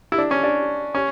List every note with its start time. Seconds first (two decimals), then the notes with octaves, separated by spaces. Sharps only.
0.12 E4
0.18 D4
0.31 C#4
0.43 D4
0.95 C#4